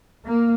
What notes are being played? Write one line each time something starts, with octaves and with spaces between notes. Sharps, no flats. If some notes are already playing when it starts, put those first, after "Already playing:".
A#3